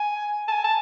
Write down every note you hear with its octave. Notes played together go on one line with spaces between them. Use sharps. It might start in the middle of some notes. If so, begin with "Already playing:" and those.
Already playing: G#5
A5
G#5
A5